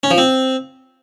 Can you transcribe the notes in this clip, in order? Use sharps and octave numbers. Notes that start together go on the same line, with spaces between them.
C#4
F3
C4